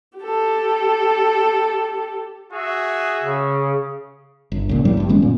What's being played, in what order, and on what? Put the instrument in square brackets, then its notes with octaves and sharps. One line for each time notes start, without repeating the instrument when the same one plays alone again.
[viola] G4 A4
[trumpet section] F#4 G#4 E5
[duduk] C#3
[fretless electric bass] G1
C#2 A#2
A2 F#3 G3
G1 G2
D#3 G#3 B3 C#4
F#2 A#2